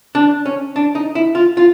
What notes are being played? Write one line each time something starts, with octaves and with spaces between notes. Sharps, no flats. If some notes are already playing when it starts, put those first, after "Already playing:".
D4
C#4
D4
D#4
E4
F4
F4